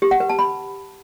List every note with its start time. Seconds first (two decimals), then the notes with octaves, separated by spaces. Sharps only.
0.02 G4
0.11 F#5
0.20 B4
0.29 A5
0.39 B5